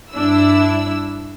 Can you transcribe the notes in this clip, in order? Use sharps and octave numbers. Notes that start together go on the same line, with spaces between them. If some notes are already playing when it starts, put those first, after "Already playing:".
G2 D4 E4 E6